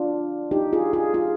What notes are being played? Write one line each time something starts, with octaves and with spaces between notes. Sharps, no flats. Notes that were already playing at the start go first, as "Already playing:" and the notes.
Already playing: D4 F4
D#4 G4
F4 G#4
F4 G#4
F4 G#4